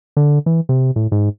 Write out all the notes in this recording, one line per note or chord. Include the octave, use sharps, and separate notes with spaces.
D3
E3
C3
A2
G#2